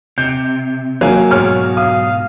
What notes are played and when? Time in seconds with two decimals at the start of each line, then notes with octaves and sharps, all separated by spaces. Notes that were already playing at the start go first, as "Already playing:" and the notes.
0.18 C3 G6
1.01 F#3 A#3 G#5
1.31 G#2 B2 C#5 F6
1.77 F5 D#6